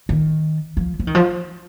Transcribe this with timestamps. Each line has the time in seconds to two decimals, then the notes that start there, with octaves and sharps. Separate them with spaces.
0.09 D#3
0.77 F3
0.99 F3
1.07 D#3
1.15 F3